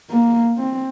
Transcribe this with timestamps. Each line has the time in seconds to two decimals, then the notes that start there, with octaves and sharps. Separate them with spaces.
0.10 A#3
0.58 C4